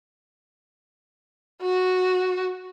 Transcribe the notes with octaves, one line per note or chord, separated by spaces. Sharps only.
F#4